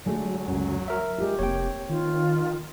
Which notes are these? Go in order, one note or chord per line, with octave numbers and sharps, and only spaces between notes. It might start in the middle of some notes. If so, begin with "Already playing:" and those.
D3 F#3 G#3 A3
C#2 F#2
A#4 E5
G#3 F4 G4
F1 A#3 C4 C#5 G5
D#3 F4